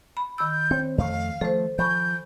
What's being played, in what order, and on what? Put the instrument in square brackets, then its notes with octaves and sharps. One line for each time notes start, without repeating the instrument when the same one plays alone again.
[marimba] B5
[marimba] D#3 B5 E6 [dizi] G6
[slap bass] C4 [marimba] C#5
[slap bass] F2 A3 [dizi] F5
[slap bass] F3 A3 [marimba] A4 C5
[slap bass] F3 [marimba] G#5 B5 C#6 [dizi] G6